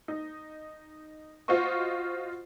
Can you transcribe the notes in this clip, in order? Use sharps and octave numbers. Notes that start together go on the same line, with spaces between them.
D#4
F4 F#4 C5 D#5 C#6